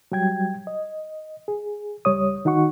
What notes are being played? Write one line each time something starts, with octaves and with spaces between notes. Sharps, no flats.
F#3 G3 G5 G#6
D#5
G#4
C#2 G3 C#5 D#6
D#3 D#4 F#4 F#5 C#6